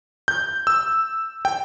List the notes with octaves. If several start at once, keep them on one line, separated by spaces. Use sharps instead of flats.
G6
E6
G5